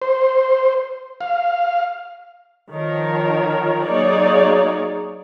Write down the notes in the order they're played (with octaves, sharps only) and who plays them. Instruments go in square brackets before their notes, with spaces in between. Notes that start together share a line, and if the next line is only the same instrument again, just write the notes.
[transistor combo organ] C5
F5
[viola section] D#3 F3 A#4 C#5
F#3 A#3 D#4 G#4 C#5 D5